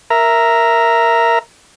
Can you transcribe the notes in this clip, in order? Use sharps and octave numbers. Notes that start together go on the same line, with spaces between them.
A#4 E5 A#5